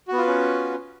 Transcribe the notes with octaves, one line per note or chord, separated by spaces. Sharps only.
B3 C#4 F4 F#4 B4